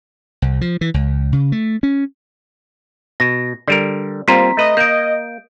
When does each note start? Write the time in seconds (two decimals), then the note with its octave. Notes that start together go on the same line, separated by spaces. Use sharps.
0.42 C2
0.61 F3
0.81 E3
0.94 C#2
1.33 C#3
1.52 A3
1.83 C#4
3.20 B2 A#6
3.68 D3 G3 A#4 D5
4.28 G3 A#3 C4 F4 A#5 C6 B6
4.57 A3 B4 D#5
4.77 A#3 G6 D7